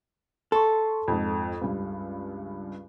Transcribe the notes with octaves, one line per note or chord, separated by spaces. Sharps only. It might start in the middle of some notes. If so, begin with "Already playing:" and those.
A4 C6 C#6
F2 G#2
C#2 G2